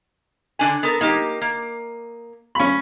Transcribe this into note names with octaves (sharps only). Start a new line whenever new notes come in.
D3 D4 G#5
B3 A4 A#4
A#3 D#4 G4
A#3
C#4 B5